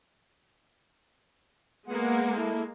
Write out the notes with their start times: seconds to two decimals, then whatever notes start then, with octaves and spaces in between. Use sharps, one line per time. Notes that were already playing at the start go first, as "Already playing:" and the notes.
1.88 G#3 A#3 B3 F#5
2.37 E4 A4